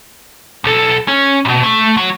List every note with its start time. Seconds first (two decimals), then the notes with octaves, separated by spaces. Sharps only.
0.64 B1 A4
1.08 C#4
1.45 G#2 B2
1.63 A3
1.97 F#3